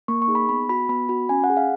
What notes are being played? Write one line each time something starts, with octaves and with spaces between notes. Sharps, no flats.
A#3 C#6
C#6
D#4 G#4
B5
B3 B5
F#4 B5
B3 B5
F#4 B5
C#4 G#5
F#5
G#4
F5